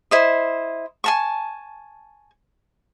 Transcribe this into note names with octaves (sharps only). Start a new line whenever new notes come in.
E4 C5 D#5
G#5 A5 C#6